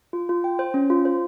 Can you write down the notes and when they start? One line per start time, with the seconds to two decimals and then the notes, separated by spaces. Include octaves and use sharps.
0.13 F4
0.29 F4
0.44 G5
0.59 C5
0.74 C#4
0.90 F4
1.05 C5